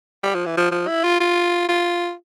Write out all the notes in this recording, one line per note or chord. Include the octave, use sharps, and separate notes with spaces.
G3
F3
E3
F3
F3
E4
F4
F4
F4